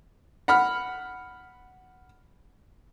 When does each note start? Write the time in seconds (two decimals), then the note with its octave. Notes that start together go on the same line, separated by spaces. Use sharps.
0.48 F#5 B5 F6